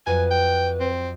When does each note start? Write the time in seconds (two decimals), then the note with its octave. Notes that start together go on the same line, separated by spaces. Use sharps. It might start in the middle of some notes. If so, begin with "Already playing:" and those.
0.06 F2 F#3 B4 G#5 D#7
0.31 G5
0.80 C4